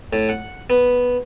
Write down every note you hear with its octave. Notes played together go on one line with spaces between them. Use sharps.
A2
F#5
B3